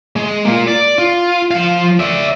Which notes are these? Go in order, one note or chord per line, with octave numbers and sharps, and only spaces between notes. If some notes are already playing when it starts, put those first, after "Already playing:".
G#3
A#3 F4
D5
F4
F3 F5
D5 E5